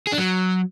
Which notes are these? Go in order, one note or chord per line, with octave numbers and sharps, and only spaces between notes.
G#4
D4
F#3